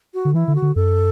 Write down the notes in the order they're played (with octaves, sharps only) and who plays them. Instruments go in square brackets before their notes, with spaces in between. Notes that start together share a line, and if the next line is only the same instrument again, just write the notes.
[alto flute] F#4
[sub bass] D3
[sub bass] E3 [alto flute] E4
[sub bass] D3
[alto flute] F#4
[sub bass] D3
[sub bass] F#2 [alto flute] A4